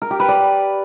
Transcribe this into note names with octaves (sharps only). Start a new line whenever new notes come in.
A#4
G4
B4
D5